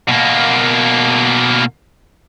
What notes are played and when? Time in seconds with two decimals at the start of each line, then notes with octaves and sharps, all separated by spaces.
0.09 B2 A#3